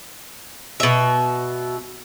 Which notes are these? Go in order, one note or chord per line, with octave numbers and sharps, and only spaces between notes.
B2 E5